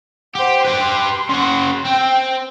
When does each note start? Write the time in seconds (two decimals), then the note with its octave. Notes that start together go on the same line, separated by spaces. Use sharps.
0.35 G4 C5 F#5
0.65 G4 B4 C6
1.29 C#3 F#4
1.85 C4 G5